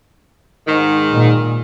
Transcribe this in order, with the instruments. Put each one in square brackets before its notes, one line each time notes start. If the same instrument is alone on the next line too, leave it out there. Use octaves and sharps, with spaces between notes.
[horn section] G#2 D#3
[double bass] A#2